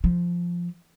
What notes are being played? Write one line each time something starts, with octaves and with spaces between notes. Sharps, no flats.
F3